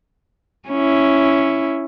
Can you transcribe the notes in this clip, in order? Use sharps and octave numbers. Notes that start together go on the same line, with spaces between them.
C#4 E4